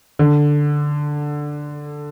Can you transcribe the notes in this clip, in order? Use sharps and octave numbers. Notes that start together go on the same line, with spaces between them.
D3